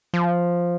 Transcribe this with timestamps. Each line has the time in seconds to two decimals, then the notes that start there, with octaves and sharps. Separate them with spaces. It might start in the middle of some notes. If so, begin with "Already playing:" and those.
0.14 F3